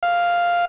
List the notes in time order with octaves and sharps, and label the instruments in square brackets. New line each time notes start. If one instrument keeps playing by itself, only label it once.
[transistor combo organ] F5